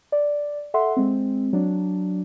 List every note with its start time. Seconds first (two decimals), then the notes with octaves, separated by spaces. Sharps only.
0.12 D5
0.74 A4 E5 F#5 C6
0.97 G#3 C4
1.53 F#3 D4